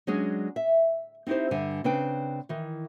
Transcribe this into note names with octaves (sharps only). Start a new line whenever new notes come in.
F#3 G#3 C#4 D4 G#4
E5
C4 D#4 E4 G4 C5
G2 D3 E5 G#5
C#3 C4 D4 B4 G5
D#3 E3